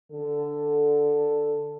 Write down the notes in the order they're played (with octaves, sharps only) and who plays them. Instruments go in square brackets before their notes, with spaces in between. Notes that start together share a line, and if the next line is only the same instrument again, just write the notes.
[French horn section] D3 A4